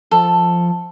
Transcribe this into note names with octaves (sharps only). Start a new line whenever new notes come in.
F3 A4